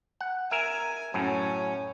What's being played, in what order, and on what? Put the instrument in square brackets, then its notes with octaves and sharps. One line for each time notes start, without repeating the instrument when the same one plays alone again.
[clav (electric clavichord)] F#5
[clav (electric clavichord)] A#4 E5 [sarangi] G#5
[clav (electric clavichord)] F#2 A2 [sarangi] C#4